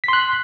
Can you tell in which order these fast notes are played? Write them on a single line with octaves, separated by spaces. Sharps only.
B6 C6 F#6